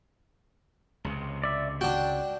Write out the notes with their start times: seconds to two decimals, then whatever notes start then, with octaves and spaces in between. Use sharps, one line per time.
1.05 C#2 C3
1.44 D5 E5
1.81 D4 F#4 G5